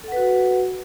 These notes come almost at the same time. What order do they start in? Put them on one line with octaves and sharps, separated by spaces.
A4 F#5 B4 F#4